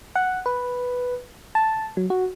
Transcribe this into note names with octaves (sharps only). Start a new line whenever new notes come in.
F#5
B4
A5
F#3
F#4